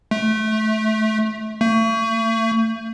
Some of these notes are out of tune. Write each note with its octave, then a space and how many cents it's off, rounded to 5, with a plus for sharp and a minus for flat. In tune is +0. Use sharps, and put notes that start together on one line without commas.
A3 -20
A3 +40